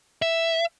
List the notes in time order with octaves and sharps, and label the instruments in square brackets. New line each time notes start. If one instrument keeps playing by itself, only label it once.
[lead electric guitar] E5